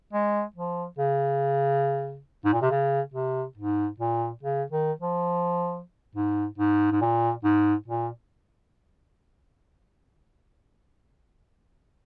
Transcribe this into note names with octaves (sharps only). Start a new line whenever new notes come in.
G#3
F3
C#3
G#2
A#2
C3
C#3
C3
G#2
A#2
C#3
D#3
F3
G#2
G#2
G#2
A#2
G#2
A#2